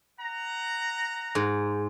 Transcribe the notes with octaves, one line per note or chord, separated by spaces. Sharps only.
F#5 A#5
G#2